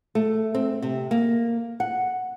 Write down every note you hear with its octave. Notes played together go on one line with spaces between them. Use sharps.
A3
C4
C3
A#3
F#5